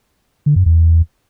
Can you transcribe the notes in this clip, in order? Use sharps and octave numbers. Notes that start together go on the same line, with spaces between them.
D3
F#2
E2